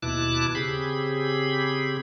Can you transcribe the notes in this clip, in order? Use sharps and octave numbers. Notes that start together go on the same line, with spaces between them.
D#2 B2 E4 A5 D6 F#6
C#3 C4 G4 G#4 B5